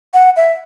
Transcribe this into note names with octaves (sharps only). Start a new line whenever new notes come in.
F#5
E5